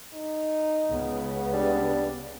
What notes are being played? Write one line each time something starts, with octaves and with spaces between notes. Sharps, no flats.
D#4
C#2 C#3 B3
G3 D4